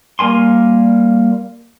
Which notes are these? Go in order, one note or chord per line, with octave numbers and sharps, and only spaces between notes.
G3 A#3 A#4 G#5 C6